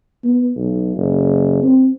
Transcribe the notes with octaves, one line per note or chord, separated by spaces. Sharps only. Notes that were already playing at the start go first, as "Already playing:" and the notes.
B3
B1
F#1
C4